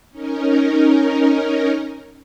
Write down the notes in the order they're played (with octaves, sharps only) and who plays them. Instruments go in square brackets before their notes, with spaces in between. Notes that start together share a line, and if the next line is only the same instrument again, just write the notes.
[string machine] C#4 D#4 A#4